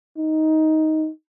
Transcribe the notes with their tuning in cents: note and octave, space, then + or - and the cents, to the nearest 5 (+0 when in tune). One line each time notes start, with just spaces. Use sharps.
D#4 +10